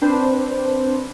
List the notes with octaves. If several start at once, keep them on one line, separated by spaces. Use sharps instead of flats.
C4 D4 B4 C5